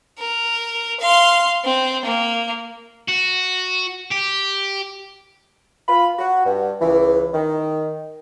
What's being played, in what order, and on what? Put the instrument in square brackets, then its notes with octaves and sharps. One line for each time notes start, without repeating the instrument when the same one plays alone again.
[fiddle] A#4
F5 C6
C4
A#3
[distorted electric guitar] F#4
G4
[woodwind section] F4 B5
F#4
G2
C#2 E3
D#3